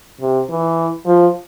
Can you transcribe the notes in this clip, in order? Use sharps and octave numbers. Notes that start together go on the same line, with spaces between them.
C3
E3
F3